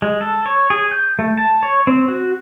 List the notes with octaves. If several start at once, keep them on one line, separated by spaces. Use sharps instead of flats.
G#3
A4
C#5
G#4
G6
A3
A5
C#5
C4
F#4